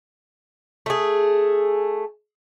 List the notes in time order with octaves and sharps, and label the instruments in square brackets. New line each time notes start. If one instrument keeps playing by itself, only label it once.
[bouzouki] A3 G#4